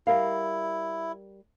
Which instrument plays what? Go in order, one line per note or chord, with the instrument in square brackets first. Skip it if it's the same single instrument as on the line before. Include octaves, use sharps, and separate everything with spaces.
[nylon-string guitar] G3 A#4 F5 [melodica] E4